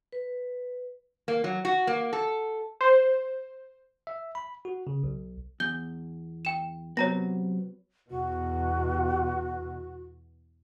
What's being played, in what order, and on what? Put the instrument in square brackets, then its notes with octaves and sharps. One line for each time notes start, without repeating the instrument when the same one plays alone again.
[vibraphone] B4
[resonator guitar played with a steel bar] A#3
F#3
F#4
A#3
A4
[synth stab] C5
[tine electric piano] E5
B5
F#4
C#3
B1
[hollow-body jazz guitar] E2 [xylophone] G6 G7
[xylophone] G5 E7
[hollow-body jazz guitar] C3 F#3 B3 [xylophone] C#5 A#5 A#6
[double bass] E2 B2 [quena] F#4